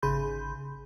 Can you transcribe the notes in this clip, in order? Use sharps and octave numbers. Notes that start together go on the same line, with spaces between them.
G#1 C#3 G#4 B5 C6 G6